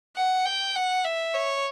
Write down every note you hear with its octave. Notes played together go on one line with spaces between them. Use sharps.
F#5
G5
F#5
E5
C#5